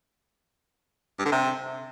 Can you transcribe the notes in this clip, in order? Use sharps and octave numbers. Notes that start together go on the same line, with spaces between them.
G2
D3
C3